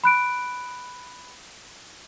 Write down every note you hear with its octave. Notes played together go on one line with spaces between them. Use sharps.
B5 F#6 D7